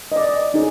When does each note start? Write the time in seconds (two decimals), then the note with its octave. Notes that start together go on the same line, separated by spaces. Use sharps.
0.12 D#5
0.16 D5
0.54 D#4 G#4 C#5